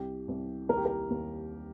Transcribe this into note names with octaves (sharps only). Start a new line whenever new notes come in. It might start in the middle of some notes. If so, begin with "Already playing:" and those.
Already playing: C2 G4
C2
D#2 A#4
G4
A#4
D#2